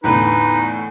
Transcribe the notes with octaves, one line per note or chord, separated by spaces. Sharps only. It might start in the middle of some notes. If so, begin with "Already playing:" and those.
E2 A2 D3 D#4 B4